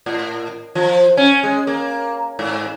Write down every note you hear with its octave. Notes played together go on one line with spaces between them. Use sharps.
A2
F3
C#4
G#3
A#3
G#2